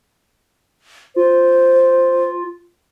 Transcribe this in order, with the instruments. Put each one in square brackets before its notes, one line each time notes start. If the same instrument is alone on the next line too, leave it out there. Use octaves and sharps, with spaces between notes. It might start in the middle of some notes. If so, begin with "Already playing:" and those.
[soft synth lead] F4 [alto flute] C5